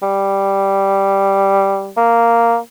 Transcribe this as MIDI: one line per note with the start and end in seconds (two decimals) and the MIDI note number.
0.02 1.91 55
1.97 2.57 58